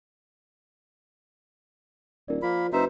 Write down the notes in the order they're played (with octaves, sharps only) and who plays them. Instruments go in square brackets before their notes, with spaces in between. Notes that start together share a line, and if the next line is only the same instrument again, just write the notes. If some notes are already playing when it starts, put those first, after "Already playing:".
[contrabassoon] D#1 [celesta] A#4 D5
[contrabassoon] F3 [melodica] A#3 B5
[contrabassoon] F#1 [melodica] D#4 C5 E5 [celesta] F#4 B4